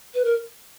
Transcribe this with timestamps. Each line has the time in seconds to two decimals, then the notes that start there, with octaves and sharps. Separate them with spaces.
0.14 B4
0.25 A#4